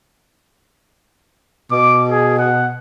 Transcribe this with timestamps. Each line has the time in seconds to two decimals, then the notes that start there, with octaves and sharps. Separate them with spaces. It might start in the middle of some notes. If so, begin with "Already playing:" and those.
1.72 B2 D6
2.09 G#4
2.39 F#5